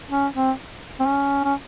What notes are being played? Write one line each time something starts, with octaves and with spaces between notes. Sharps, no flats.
C#4
C4
C4
C#4
C#4